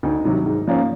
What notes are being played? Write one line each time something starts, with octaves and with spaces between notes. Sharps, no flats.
D2 D#4
C3 D#3 F#3
G#2
F3 A#3 C#4